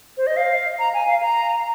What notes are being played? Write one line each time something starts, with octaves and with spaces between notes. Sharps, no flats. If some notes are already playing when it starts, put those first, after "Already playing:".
C5
D#5
F5
A#5
G#5
F5
A#5